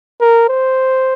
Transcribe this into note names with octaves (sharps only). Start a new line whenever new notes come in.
A#4
C5